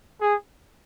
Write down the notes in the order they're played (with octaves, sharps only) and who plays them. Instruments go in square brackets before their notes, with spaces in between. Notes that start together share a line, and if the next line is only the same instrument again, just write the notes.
[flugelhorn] G#4